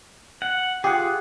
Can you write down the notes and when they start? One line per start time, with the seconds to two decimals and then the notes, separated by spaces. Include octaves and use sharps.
0.42 F#5
0.84 F4 G4 G#4 F#5